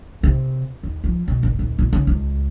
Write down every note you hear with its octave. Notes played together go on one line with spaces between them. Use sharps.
C3
D#2
F3
B2
F#1
D#1
A#2
C#3
C#2